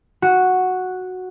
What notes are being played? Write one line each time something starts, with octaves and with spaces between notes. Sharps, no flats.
F#4